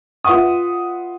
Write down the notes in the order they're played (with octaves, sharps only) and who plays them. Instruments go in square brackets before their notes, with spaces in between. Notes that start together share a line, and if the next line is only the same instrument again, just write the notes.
[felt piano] F4 B4 E5 F#5 D#6